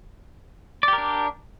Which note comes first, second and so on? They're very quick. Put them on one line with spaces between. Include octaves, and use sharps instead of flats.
D5 G4 A#4 D4